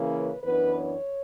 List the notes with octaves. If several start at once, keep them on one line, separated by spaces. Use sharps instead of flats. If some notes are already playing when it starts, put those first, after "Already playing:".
Already playing: C#3 E3 A#3 C#4
B4
F#2 E3 B3 D4 B4
C#5